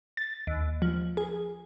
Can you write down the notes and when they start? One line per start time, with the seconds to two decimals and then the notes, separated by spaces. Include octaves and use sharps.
0.17 A6
0.47 D#2
0.82 F3
1.17 G#4